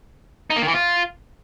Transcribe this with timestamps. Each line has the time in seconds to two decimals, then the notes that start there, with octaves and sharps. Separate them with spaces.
0.50 D#4
0.56 A#3
0.62 D#3
0.68 E3
0.74 F4